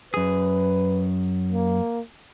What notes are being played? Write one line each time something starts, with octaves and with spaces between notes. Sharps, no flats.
F#2 G#4 B4
A#3